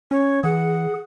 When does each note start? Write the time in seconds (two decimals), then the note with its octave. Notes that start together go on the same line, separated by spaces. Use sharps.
0.11 C#4 C#5
0.44 E3 G#4 F#5